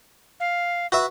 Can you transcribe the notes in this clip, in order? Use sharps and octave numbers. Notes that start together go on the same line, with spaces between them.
F5
F#4 B4 E5